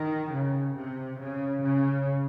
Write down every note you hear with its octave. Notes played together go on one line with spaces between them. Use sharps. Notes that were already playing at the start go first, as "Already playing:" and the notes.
Already playing: D#3
C#3
C3
C#3
C#3